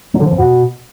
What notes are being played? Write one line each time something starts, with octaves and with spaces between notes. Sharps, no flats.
F#3
D3
F3
F2
B2